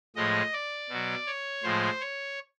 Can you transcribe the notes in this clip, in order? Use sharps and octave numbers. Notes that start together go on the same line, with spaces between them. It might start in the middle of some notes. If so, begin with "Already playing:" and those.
A2 F3 G#3 D#5
D5
B2 F#3
C#5
A2 F3 G#3 C5
C#5